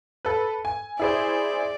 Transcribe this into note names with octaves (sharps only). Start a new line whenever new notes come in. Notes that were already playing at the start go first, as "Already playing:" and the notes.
A4 B4
G#5
E4 G#4 C5 D5